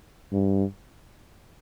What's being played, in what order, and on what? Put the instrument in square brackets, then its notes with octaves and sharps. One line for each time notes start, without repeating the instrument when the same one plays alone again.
[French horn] G2